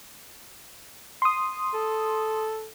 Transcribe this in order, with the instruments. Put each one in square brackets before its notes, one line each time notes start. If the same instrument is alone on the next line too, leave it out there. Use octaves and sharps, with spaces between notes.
[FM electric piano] C6 D#6
[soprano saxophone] A4